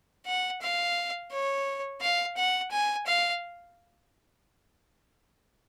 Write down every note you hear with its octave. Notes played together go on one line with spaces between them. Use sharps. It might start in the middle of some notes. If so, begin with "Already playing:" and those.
F#5
F5
C#5
F5
F#5
G#5
F5